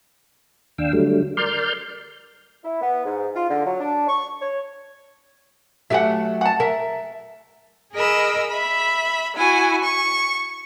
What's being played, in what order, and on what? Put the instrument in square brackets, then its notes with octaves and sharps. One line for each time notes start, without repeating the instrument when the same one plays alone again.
[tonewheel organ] D#2 D4 F5 G5 E6
D3 F#3 G3 A3
A#4 D5 C6 F6 G6
[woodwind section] E4
B3
G#2
F4
D3
F#3
D4
C#6
C#5
[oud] F#3 A3 G4 [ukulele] E5 F#5
[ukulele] F#5 A5
[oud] A#4 [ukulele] E5
[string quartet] G#4 A#4 D#5 B5 E6
E5 B5
E4 F#4 G#5
C#6